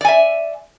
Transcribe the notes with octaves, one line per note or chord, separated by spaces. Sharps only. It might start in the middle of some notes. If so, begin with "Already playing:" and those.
D5 E5 G#5